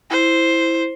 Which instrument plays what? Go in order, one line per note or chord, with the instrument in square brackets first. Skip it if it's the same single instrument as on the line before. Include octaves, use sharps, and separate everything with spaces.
[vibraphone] E4 [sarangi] C5